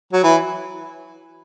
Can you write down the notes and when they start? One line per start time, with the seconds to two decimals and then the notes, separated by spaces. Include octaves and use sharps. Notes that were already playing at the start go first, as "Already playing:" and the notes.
0.13 F#3
0.23 E3